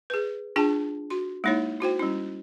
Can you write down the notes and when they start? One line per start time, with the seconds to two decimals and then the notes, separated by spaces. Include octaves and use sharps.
0.10 G#4 B4
0.56 D4 F4 G#4 G5 A5
1.10 F#4 C6
1.44 G#3 A#3 D#4 E4 C#5
1.81 E4 F#4 C5 G5
1.99 G3 C#4 E4